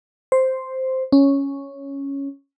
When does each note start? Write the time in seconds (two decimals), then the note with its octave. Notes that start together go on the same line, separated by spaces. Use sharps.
0.32 C5
1.12 C#4